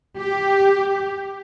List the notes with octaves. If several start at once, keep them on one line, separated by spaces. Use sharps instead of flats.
G4